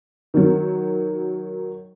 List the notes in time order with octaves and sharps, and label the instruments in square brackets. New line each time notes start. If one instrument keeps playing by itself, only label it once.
[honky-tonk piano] D#3 F#3